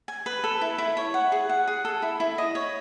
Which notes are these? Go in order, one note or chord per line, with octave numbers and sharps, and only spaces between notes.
G#5
B4
A4
E4
E4
C#5
F#5
G#4
F#5
G#4
A4
E4
E4
D#5
C#5